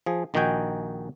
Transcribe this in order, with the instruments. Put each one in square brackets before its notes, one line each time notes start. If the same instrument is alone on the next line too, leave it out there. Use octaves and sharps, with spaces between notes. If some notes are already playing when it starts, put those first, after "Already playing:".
[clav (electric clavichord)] F3 G#4
A#1 D#3 D#4 F#4 G5 G#5